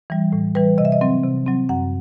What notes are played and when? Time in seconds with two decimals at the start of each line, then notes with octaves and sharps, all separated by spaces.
0.10 E3 G3
0.33 A2
0.55 E3 G3 B4
0.78 C3 D#5
0.85 E5
0.92 D#5
1.01 F#3 C4
1.24 C3
1.46 F#3 C4
1.69 F#2 F#5